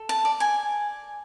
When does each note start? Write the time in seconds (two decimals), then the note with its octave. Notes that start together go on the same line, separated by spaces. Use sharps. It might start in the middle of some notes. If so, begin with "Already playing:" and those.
Already playing: A4
0.09 A5
0.25 D5
0.40 G#5